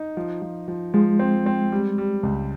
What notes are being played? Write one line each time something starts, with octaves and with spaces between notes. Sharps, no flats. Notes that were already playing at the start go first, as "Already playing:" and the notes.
Already playing: D#4
F3
F3
F3
F3 G#3
C4
C4
G3
G3
C#2